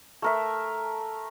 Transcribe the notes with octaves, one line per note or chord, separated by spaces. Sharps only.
A3 A#4 E5